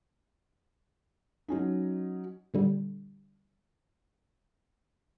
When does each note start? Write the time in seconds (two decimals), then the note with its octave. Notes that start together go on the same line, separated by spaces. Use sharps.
1.48 F#3 C#4 D#4
2.54 A#2 D3 G3